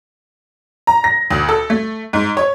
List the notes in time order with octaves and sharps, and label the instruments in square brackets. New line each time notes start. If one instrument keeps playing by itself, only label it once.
[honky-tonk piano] A#5
A#6
D2
A4
A3
G#2
C#5